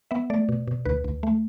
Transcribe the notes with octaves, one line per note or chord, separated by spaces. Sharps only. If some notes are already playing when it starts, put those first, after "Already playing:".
B3 E5
A3 D5
B2
B2
D2 B4
D2
A3